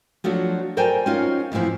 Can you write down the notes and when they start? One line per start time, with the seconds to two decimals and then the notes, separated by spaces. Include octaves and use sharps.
0.24 F3 F#3 A3 D4 F#4
0.77 A4 A#4 C5 D5 G5 G#5
1.06 C#4 D#4 F4 F#4
1.52 F2 A2 C3 E3 F3